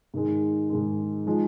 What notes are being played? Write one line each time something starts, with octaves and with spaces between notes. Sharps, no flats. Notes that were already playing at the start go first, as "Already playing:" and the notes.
G#2 D#3 G#3
G#2 D#3 G#3
F3 G#3 D#4